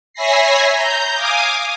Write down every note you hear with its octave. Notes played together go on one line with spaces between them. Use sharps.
C#5 E5 G#5 B5 A#6 C7
A#5 G6
F5 G#5 D6 D#6